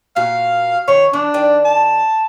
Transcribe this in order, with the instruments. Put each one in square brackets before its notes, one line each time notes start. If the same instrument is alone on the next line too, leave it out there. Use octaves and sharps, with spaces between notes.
[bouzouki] A#2 F#4 [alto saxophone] F5
[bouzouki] D#3 F3 [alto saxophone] C#5
[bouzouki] E3 [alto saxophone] D4
[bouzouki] D#3 D5 G5
[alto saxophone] A5